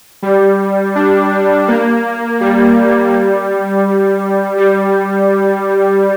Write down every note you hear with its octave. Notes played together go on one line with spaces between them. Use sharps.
G3
D4
A#3
G3
G3